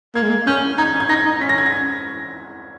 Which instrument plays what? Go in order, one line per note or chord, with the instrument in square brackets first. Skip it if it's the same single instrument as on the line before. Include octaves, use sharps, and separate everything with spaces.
[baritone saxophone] A#3 [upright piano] G#6
[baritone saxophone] G#3
A#3
[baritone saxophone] C#4 [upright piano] G6
[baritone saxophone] D#4 [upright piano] G#6
[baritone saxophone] C#4
[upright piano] G#6
[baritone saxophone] D#4 [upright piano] A#6
[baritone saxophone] D#4
[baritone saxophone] C#4 [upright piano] B6
[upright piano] A#6
G#6
A#6